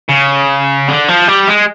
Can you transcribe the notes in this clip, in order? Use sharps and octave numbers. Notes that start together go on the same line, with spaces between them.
C#3
D3
F3
G3
G#3